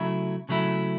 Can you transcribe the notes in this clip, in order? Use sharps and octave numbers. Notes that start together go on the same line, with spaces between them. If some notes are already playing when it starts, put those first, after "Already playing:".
Already playing: C#3 F#3 A3 E4
C#3 F#3 A3 E4